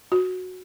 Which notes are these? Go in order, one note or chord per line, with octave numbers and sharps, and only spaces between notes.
F#4